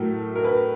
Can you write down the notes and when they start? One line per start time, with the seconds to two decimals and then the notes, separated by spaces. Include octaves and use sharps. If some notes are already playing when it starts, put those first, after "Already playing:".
Already playing: A2 F#3 A3 A#4
0.35 A#4
0.44 B4